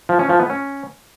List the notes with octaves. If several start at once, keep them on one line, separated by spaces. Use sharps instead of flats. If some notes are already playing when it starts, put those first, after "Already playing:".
F3
C#4
F3
B3
C#4